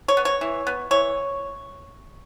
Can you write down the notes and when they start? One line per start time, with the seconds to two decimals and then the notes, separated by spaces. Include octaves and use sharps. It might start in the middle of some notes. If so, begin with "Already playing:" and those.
0.08 C#5
0.17 B3
0.25 C#5
0.41 E3
0.67 B3
0.91 E3 C#5